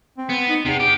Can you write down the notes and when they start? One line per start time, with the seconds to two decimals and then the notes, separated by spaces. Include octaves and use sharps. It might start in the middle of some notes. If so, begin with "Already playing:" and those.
0.18 C4
0.29 B3
0.48 D#4
0.65 E2 C3
0.80 G4